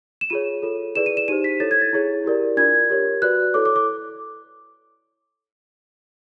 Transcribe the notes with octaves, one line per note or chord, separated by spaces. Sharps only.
E7
F4 G#4 C#5 D#7
F4 A4 C#5
E4 G#4 B4 D5 E7
D#7
E7
D#4 G4 C5 D#7
B6
E4 A4 C#5 A6
G#6
A6
E4 G#4 C#5
E4 G4 A#4 D5
D4 F4 A#4 D5 G#6
G4 A#4 C#5
F#4 B4 D5 F#6
E4 A4 C#5 D6
D6
D6